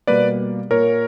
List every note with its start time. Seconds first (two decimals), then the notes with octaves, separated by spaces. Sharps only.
0.07 B2 G3 A#3 B4 D5
0.71 A#2 A#3 A#4 C#5